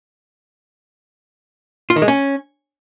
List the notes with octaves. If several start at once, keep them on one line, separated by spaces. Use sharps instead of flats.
F4
D#3
G#3
C#4